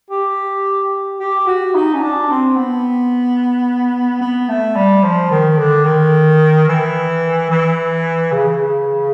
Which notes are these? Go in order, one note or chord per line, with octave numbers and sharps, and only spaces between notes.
G4
G4
F#4
D#4
C#4
D4
C4
B3
B3
A3
G3
F3
D#3
D3
D#3
E3
E3
C#3